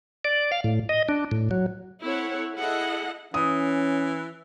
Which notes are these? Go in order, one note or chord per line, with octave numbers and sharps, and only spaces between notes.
D5
F5
A2
D#5
D4
A2
F#3
C4 E4 A4 C#5 F#5
E4 G#4 A4 D#5 F#5
E3 C#4 D#6